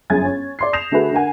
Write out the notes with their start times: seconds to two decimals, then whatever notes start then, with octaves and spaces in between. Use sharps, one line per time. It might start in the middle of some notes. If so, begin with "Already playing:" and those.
0.10 G1 F#2 G#4 G#5 G#6 A6
0.25 C#4
0.59 D5 C6 C7
0.73 D#6 G6 A#6 C7 E7 F7
0.91 D3 A3 F#4 G#4 B4
1.11 D3 A#4 F#5 G#5